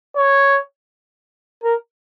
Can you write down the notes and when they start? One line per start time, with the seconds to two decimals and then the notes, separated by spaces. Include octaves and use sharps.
0.16 C#5
1.64 A#4